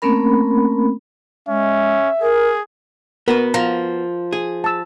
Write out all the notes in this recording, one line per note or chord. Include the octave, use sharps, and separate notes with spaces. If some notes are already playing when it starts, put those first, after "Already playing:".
A3 A#3 C4 C#4 A#4 B5
G#3 C#4 E5
G#4 A#4
B3 F#4 A#4 B4
F3 A#5
G#4
A5 E6